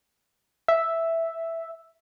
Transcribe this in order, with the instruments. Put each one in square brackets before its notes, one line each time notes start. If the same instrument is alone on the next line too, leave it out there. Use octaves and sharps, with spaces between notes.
[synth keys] E5